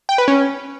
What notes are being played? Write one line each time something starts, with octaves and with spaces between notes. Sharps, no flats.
G5
B4
C#4